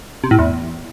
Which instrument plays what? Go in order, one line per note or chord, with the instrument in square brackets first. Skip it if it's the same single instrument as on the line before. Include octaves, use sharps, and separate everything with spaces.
[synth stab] C3
A2
E2